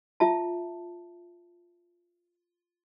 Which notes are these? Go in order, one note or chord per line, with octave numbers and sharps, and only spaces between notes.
F4 E5 A5